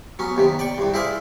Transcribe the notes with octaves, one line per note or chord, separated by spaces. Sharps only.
F#3 B3 C#4
D#2 C3 B3
D5 G5 C#6
C2 G2
E4 G#4 C5 D5 E5 F5